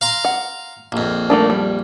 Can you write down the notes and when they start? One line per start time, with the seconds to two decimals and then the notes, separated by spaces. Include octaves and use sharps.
0.01 F5 A#5 C6
0.25 F#5
0.92 A#1 F2
1.30 A3 A#3 D4
1.50 G3